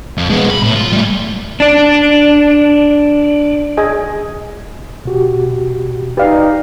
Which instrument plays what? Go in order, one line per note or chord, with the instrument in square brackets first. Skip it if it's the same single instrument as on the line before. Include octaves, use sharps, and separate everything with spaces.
[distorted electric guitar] F2
G#3 B3
B5
A2
F4
G3 A3
[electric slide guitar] D4 D5
[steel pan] G#4 D#5 G#5
[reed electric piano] B2 F#4 G4
[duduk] D#4 [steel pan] G4 F5 [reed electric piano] B4 D5